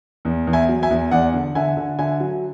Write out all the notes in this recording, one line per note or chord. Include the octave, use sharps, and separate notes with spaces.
E2
E2
E5 G#5
F#3
E5 G#5
E2
E2 D5 F#5
D3
D3 E5 G#5
D3
D3 E5 G#5
F#3